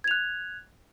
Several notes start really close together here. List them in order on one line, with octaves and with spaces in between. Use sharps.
G#6 F7 F#6